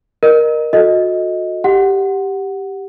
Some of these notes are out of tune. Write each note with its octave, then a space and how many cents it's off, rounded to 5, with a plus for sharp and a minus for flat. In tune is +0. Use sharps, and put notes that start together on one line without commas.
A#4 +15 D#5 -20
F#4 -30 A4 +0 D#5 +10
G4 +0 F#5 +0